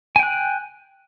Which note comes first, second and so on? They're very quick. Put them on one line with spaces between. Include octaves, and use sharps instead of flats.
G#5 G5 F#6